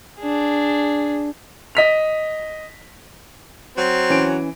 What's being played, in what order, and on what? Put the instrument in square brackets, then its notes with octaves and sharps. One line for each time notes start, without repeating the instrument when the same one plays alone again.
[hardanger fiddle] D4 G#4
[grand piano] D#5 B6 F7
[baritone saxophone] F#3 [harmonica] C4
[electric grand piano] E3 D7 [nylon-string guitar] C#4